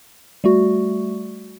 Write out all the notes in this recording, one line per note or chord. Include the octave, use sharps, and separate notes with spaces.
G3 A3 F#4